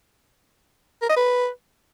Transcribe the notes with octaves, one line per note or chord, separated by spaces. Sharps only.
A#4
D#5
B4